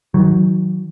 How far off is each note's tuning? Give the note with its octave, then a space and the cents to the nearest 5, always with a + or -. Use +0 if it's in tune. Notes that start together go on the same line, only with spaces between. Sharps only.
D#3 +35 F#3 +0